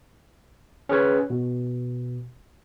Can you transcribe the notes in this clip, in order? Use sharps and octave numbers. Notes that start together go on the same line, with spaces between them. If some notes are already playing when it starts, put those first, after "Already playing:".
C#4 G#4 B4 C#5
B2